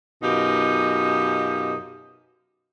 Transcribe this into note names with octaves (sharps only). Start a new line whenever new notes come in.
F#2 B2 D#4 F4 G4